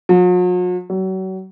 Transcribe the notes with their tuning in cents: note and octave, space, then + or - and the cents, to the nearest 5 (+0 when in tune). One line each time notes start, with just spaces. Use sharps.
F#3 -45
F#3 +35